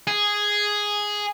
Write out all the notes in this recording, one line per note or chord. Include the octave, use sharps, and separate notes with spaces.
G#4